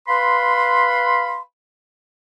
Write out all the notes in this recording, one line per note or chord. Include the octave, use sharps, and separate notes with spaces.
B4 F5 B5 C6